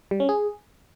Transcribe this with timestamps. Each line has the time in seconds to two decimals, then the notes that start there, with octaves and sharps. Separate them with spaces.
0.11 G3
0.20 C#4
0.29 G#4